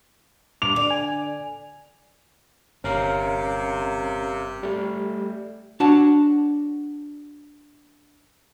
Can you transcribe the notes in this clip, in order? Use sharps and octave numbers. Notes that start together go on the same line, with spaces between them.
G2 D6 F7
D3 D5
G#5
G1 C3 C#4 A#4 F5
G3 A3
D4 F#4 C#5 F#5 A5